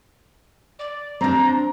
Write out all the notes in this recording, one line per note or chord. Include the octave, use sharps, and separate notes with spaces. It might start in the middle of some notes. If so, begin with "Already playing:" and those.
D5
C4 D4 A#5